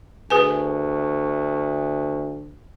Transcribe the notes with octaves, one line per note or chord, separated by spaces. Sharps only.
D2 G#4 B4 G#5